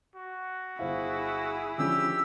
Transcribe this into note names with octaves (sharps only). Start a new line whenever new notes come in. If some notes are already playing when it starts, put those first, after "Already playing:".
F#4
G1 E4 G#4 C5 F5
D3 F3 C#4 G4 E6